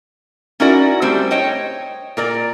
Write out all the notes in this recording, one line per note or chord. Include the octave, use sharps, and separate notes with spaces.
C#4 D#4 E4 F#4 A#4 D5
G3 A3 C4 C5
C5 C#5 D#5 G5
A#2 A#4 D5